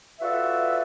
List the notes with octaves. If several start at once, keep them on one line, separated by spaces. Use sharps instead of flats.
F4 F#4 A4 B4 D5 E5